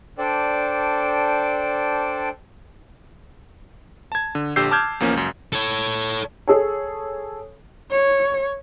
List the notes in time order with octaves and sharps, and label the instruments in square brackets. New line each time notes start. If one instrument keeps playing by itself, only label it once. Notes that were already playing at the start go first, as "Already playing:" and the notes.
[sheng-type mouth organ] D4 A4 C5 D5 G5
[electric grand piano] A5 G#6
D3
A#1 D3 G4 E6 G6 C7
A5 D6 E6 F6 G6 G#6
E2 F3 A#3 C#4
C#2 F#2
[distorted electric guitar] A4 C#5
[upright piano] G#4 A4 C#5
[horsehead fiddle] C#5